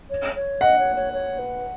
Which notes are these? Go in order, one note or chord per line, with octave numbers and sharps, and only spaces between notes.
C#5
C#5
D#5 F#5
C#5
C#5
C#5
B4